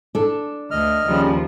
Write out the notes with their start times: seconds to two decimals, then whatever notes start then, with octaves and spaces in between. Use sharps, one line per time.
0.15 D4 A4
0.71 D2 D#5 F6
1.06 D#2 C#3 F3 G3